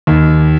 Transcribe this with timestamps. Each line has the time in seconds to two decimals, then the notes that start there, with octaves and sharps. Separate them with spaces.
0.07 D#2